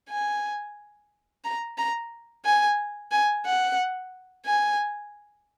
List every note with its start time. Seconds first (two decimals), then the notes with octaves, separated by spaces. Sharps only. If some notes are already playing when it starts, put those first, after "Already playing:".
0.10 G#5
1.45 A#5
1.78 A#5
2.45 G#5
3.12 G#5
3.46 F#5
4.46 G#5